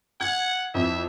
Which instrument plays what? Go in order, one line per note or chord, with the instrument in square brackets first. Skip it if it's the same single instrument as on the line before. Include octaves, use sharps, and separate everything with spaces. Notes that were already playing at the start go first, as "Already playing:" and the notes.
[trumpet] F#5 [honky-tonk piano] G#6
[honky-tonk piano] F2 E3 [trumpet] E5